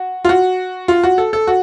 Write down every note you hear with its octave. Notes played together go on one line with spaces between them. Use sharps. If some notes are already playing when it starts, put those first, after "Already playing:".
Already playing: F#4
F4
F#4
F4
F#4
A4
A4
F#4